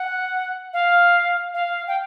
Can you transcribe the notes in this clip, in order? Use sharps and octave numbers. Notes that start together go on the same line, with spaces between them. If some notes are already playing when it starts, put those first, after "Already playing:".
Already playing: F#5
F5
F5
G5